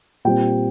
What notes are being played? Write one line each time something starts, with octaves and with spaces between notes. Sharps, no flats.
A#2 G3 C4 G5